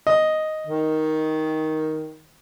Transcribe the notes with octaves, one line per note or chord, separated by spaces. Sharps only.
D#5
D#3